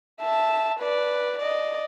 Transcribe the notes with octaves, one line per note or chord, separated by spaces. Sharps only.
E5 A5
B4 D5
D5 D#5